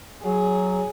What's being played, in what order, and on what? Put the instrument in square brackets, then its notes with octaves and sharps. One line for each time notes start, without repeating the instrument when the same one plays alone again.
[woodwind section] F#3 [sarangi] G#4